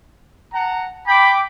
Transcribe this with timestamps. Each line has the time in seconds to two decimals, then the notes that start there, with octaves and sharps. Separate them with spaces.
0.52 F#5 A5 A#5
1.07 G5 B5 D6